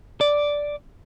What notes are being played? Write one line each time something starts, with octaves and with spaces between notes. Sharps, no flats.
D5